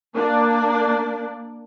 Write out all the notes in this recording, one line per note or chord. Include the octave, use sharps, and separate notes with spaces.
A#3 D4 D5